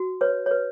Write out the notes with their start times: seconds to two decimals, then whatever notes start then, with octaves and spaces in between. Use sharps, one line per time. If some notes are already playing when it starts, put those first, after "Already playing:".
Already playing: F#4
0.21 B4 C#5
0.46 B4 C#5